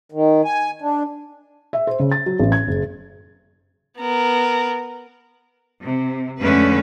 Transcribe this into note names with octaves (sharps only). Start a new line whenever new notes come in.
D#3
G#5
D4
E5
C5
C#3
A6
F#3
A1
G#6
F#1
B3 A#4
C3
F2 D3 G#3 A3 C#4 B4